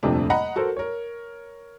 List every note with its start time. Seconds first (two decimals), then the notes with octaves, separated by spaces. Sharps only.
0.03 D#1 F2 C3 A3 D4
0.30 D#5 F#5 A#5 B5
0.56 F#4 A4 A#4 C5
0.77 A#4 C#5